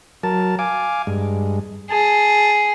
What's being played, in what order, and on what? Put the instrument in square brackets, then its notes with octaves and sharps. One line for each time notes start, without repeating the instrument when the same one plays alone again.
[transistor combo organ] F#3 A#4 A5
F5 G#5 D6
G2 G#3
[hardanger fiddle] G#4 [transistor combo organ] A5